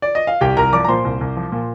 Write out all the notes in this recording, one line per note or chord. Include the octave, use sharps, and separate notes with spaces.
D5
D#5
F5
C2 G4 G5
C2 A#4 A#5
F3 D5 D6
A#5
A#2 C5 C6
C2
C2
F3
A#2